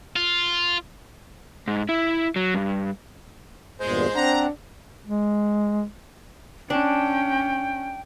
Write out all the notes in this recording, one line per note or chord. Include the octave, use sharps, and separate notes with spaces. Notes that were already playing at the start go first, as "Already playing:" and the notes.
F4
G#2
E4
F#3
G2
E2 G2 A#2 G#3 C5
C4 D4 F#5 A#5
G#3
C#4 D4 G5